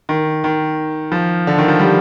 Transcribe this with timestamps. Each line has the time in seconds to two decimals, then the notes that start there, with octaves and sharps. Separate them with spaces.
0.09 D#3
0.44 D#3
1.12 F3
1.47 D3
1.58 D#3
1.68 F3
1.80 G3